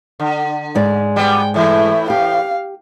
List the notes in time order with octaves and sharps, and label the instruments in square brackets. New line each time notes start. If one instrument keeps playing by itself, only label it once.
[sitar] D3
[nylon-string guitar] G#2 G#3 D5
[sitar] G3 B3 [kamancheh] G5
[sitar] A2 E3 [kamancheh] A3 E4
[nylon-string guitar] G4 [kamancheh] F5